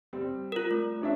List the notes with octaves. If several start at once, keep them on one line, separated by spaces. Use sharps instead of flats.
G3 C4
F4 A#4
A3
C#4 D4 E5